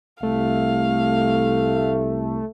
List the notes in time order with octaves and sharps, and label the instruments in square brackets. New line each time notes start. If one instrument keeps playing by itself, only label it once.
[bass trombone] C2 [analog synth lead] A3 [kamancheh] F5